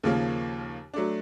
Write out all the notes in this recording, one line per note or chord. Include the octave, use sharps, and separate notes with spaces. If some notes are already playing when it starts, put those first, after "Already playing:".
D#2 C#3 F3 A#3
F#3 A3 D4